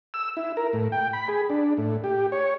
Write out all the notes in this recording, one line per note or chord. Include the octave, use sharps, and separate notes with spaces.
E6
E4
A#4
A2
G5
B5
G#4
D4
A2
G4
C#5